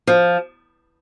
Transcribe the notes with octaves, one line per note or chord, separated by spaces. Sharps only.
F3